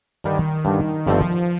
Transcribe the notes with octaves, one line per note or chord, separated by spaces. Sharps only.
G2 D3 D#3 G3 D4
G2 D3 G3 D4
G1 G2 D3 F3 A3 C4